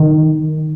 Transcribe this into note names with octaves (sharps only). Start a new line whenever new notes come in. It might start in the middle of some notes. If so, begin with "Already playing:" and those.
Already playing: D#3